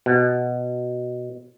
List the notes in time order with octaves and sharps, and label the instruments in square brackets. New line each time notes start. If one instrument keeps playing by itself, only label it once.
[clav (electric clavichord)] B2